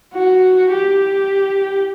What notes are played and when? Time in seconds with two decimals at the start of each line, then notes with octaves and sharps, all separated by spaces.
0.14 F#4
0.71 G4